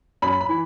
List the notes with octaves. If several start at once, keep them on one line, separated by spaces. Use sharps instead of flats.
F#2 B5
B5
E3